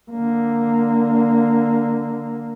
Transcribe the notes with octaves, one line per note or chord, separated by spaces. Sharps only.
D3 A#3